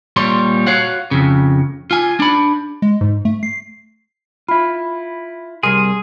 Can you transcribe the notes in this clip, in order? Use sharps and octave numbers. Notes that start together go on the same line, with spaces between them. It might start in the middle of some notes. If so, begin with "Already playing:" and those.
A#2 G3 C#5 C6
F#4 C#5 F5 F#5
F2 C#3
F4 G#5
D4 B5
G#3
G#2
A3
C7
E4 F4 B5
C2 G3 G#4 A#4 C6